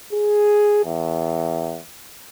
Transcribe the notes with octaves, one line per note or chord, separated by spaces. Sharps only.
G#4
E2